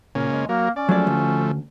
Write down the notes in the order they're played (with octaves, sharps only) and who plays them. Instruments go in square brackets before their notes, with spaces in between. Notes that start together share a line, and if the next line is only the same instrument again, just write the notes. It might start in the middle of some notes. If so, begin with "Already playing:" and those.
[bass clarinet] A#2 [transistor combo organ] C#3 A#3 C#4
[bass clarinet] G#3
[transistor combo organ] F#3 A#4 [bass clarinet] A#3
[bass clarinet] C#4 [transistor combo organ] D5
[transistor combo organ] F3 A3 [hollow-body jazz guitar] F#3 G#3 D5
[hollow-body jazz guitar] D2